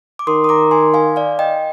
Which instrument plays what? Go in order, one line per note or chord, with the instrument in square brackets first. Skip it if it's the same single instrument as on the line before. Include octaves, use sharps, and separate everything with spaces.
[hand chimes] D6
[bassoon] D#3 [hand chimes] C6 D#6
[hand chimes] D#6
A#5 D6
G#5 C6
F5 G#5
D5 F5
D#5 G5